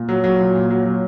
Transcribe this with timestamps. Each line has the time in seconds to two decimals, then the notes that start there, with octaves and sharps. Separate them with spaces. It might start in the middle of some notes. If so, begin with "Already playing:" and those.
Already playing: A#2
0.09 F#3
0.24 F#3
0.40 A#2
0.55 A#2
0.70 F#3
0.85 F#3